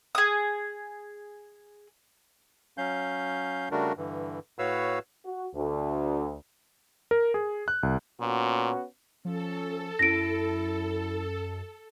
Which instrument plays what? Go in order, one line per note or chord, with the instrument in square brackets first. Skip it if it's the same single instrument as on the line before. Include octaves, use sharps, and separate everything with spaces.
[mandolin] G#4 D#6
[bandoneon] F#3 C#4 F5 G6
C#3 G3 A3 D4 F#4 A#4
G2 D3 E3
A2 F#4 B4 C#5 F5 E6
[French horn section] F#4
D2
[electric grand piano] A#4
G#4
F#6
C2
[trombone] A#2 [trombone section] B3 C#4 F#4
[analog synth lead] F3 [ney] C#4 [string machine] A4
[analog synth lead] F#2 [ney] E4 [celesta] A#6 D7